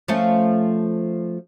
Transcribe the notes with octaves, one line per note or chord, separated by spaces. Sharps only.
F3 A3 C#4